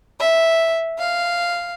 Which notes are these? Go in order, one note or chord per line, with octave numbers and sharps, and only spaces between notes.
E5
F5